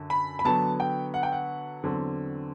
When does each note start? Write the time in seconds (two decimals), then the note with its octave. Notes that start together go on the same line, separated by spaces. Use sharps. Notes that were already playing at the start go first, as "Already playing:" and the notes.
Already playing: F#2 D3
0.10 B5
0.39 B5
0.45 D3 F#3 B3 A5
0.80 G5
1.14 F#5
1.23 G5
1.32 F#5
1.84 E2 D3 F#3 C4